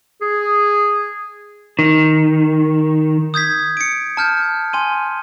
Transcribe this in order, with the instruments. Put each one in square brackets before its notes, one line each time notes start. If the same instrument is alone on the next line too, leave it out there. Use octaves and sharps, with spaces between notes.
[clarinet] G#4
[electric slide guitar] D#3
[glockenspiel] D#6 G6 G#6 B6
C#7 D7
A5 F6 G6
G#5 C6 D#7